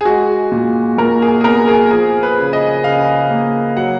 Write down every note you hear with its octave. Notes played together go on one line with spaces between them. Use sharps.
G#4
G#3 F#4
A#2
A#2 A#4
G#4
G#4
B3 A#4
G#4
F3 G#4
B4
C#3
D#5
C#3 F5
A#3
F#3 F#5